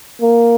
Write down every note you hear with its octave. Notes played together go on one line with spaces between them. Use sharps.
A#3